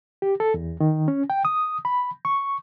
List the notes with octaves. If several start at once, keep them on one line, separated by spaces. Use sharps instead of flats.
G4
A4
E2
D#3
C#4
G5
D#6
B5
C#6